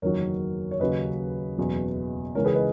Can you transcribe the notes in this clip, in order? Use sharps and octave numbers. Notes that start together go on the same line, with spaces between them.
F#1 E2 D#3 F#3 A#4 C#5
C#5
D#2 C#3 F#3 B4 D#5
F#1 E2 B2 F#3
C#2 C#3 E3 A#4 C#5
G#4 B4
B4 D#5